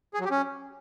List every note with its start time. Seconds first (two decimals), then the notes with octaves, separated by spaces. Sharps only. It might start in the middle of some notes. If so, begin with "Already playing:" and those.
0.14 G#4
0.20 F#3
0.25 G4
0.31 C#4